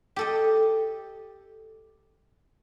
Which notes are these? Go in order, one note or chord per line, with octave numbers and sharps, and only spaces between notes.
G4 A4 D#5